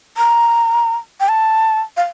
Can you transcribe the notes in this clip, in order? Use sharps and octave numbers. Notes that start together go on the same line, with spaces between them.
A#5
G5
A5
F5